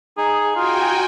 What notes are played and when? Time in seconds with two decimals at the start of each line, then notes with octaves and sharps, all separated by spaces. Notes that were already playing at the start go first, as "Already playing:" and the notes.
0.17 D#4 G#4
0.56 F4 F#4 G5 G#5